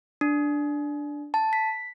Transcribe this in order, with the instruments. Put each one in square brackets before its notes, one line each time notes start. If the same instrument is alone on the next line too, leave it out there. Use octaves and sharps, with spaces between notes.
[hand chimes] D4
A5
B6